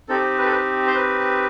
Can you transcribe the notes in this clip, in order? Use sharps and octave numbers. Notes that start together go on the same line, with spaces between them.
C4 D#4 G4 A4
B4
A4
B4
C5
B4